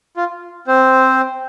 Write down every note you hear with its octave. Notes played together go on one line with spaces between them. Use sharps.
F4
C4 C5